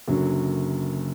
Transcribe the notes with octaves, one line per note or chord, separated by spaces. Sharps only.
F#1 F#2 D3 F#3